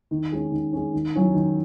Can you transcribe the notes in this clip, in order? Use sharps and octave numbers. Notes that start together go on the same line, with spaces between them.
D#3
G#3 C#4
D#3
G#3 C#4
D#3
F#3 C#4 E4
D#3